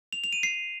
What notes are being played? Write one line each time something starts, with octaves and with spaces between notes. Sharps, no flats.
F7
F7
D#7
C7